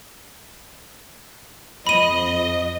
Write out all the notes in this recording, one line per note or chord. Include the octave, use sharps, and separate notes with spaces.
F2 D#5 B5 D#7